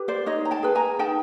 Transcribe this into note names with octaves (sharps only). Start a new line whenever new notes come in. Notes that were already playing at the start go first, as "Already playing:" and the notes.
Already playing: G4 B4
C5 D5
D#4 C#5 D#5
A#5
G5 A5
G#4 B4
G#5 A#5
D#4 G5 A5